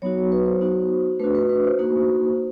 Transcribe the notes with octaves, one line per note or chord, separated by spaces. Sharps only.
F#3 B3 D#4 F#4 C#5
B4
C5
B3 D#4 F#4
A3 D4 F#4 B4
B4
B4
C5
A#3 D#4 F#4